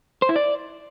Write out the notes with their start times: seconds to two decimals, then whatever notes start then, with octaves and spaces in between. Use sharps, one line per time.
0.22 C5
0.29 E4
0.36 D5